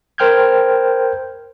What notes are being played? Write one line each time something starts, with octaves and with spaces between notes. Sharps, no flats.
A#4 C5 G5 F6 G6 G#6